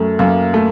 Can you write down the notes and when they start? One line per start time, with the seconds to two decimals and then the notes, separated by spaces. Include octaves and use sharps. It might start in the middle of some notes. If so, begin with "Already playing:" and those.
Already playing: F#2 A3
0.19 F#2 A#3
0.54 A3